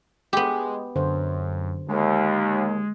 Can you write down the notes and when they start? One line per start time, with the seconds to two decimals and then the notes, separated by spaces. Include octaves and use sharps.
0.33 G#3 B3 G4
0.96 F#2 D3 C5
1.89 D#2 G#3